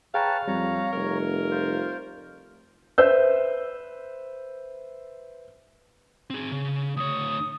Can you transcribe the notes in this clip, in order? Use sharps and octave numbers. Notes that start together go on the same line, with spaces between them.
G#4 B4 C#5 F5 G5 A5 A#5
F2 G3 C#5 A#5
F1 A#4
F4 C5
B4 C5 E5 E6 G6
C4 G#4
C#3
D2 C#5 D#6